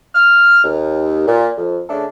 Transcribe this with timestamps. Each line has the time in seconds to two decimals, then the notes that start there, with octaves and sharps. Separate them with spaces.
0.15 F6
0.64 D#2
1.28 A#2
1.58 F2
1.90 C#3 A3 D4 A4